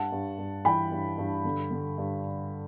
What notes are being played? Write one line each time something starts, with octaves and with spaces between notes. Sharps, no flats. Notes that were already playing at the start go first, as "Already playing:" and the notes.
Already playing: G2 F#5 A5
G2
G2
E3 G5 B5
G2
G2
D3
D3
G2